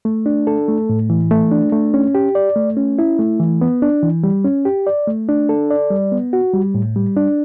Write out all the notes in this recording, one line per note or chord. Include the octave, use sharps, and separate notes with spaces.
A3
D4
A4
A3
A2
E3
A3
D4
A3
C#4
G4
D5
A3
C#4
E4
A3
E3
B3
D4
E3
G3
C#4
G4
D5
A3
D4
A4
D5
G3
B3
F#4
G3
A2
G3
D4